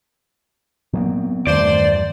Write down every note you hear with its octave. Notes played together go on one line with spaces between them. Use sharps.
A#2 F#3 B3 C4
E2 G2 D#3 A3 C5 D5